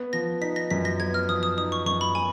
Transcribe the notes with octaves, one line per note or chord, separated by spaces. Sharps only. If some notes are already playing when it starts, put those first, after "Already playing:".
Already playing: B3
F3 A#6
D#4 B6
A#6
F#2 B6
A#6
B3 G#6
F6
F3 D#6
D#6
D#4 D#6
C#6
F#2 C#6
B5
B3 G#5